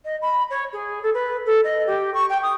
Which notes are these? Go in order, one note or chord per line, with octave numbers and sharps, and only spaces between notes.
D#5
B5
C#5
G#4
A4
B4
A4
D#5
G4
C#6
G5
D#6